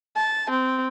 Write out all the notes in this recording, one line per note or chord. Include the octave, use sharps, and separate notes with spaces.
A5
C4